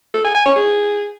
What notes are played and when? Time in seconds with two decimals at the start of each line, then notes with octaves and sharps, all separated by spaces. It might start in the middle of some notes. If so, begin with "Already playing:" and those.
0.14 A4
0.25 G#5
0.35 G#5
0.46 C#5
0.56 G#4